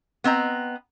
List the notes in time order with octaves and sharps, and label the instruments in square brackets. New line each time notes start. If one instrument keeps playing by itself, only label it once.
[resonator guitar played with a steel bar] B3 C4 D#5 A#5